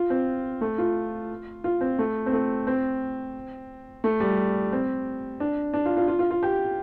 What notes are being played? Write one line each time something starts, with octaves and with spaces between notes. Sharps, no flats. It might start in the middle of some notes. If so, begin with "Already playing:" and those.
Already playing: F4
C4
A3
F4
F4
C4
A3
C4
A3
C4
A3
G3
C4
D4
D4
F4
F4
F4
F4
F4
G4